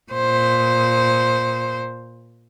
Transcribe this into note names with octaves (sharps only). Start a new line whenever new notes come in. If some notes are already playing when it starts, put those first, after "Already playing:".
A#2 C5